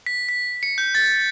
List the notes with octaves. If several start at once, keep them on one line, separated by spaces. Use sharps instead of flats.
B6
B6
C#7
G6
A6